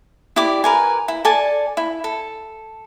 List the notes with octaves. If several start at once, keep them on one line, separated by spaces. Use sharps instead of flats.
E4 G4 D5 D6
A#4 B4 G#5
E4
A4 D5 G#5 A5
E4
A4